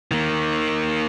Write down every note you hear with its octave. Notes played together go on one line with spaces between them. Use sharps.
D#3 A#3